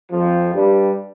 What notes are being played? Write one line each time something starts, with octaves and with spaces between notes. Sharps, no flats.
F2 F3
G2 G3